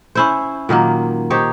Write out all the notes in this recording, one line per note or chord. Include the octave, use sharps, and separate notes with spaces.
C#4 E4 C5
A#2 D#3 F#3 A#3
D#4 G4 C5 C#5